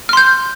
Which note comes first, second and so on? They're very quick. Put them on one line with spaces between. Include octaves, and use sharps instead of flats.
F6 C6 G6